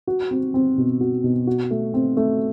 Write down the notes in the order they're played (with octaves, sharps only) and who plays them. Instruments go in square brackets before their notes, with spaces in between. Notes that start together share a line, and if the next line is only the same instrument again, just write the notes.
[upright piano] F#4
C4
C4
B2
F#4
B2
F#4
A3
C4
A3